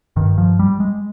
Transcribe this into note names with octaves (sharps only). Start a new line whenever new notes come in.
G2 D#3
F3
G3
G#3